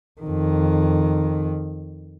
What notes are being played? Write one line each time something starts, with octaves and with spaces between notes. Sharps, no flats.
F2 D#3